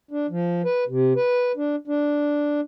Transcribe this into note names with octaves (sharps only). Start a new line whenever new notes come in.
D4
F3
B4
C3
B4
D4
D4